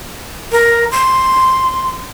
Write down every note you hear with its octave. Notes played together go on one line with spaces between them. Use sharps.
A#4
C6